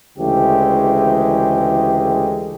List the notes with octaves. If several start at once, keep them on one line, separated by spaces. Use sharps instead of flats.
D2 C#3 E3 G#3 A3 G4